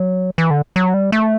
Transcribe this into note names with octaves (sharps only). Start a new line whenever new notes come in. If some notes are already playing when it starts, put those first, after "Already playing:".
Already playing: F#3
E3
D3
F#3
G3
A3